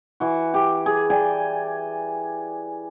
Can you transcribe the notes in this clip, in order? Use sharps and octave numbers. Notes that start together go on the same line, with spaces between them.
E3 F#4
G4
G#4
D5 G5 G#5